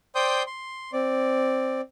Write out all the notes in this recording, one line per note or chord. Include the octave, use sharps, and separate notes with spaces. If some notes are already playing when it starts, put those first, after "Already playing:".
C5 D5 G5 C6 D#6 G6
C6
C4 D5